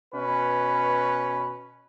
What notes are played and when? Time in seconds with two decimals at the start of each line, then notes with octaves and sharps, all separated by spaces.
0.14 B2 C#4 B4